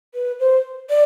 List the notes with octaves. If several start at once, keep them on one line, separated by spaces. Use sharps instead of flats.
B4
C5
D5